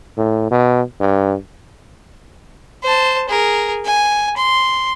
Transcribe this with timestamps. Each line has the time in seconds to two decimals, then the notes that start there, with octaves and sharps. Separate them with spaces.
0.17 A2
0.51 B2
1.00 G2
2.83 C5 A5
3.29 G#4 A#4
3.85 G#5
4.37 C6